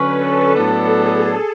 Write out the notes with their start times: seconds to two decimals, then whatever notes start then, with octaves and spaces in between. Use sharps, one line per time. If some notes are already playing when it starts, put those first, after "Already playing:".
Already playing: D3 F#3 C#4 B4
0.15 A4
0.55 A2 F#3 B3 D4
0.95 G#4